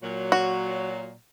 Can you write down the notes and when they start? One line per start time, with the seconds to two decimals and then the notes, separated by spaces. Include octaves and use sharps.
0.04 A#2 F#3
0.32 F#4